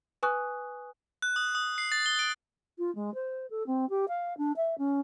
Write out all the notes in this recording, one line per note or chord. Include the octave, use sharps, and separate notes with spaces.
B4 G#5 C#6 D#6 F#6
F#6
D#6
D#6
C7
A6
G7
D7
F4
G#3
C5
A4
C4
G4
F5
D4
E5
C#4